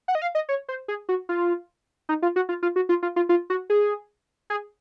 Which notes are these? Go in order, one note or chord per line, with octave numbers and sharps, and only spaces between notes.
F#5
D#5
F5
D#5
C#5
C5
G#4
F#4
F4
D#4
F4
F#4
F4
F4
F#4
F4
F4
F4
F4
F#4
G#4
G#4